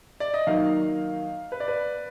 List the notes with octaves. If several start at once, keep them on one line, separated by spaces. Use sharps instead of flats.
D5
D#5
D#3 F#3 A#3 D#4 F5
B4
D5
B4